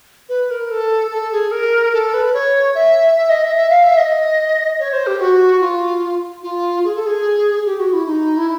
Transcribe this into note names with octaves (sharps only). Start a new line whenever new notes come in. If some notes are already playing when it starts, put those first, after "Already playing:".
B4
A#4
A4
A4
G#4
A#4
A4
B4
C#5
E5
E5
D#5
E5
E5
F5
E5
D#5
C#5
C5
G4
F#4
F4
F4
G#4
A4
G#4
G4
F#4
E4
D#4
E4